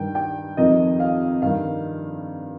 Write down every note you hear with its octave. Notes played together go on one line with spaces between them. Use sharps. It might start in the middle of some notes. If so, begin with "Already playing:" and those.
Already playing: G2 D#3 G5
G5
F2 C3 D#3 D#5
F5
G2 D#3 F5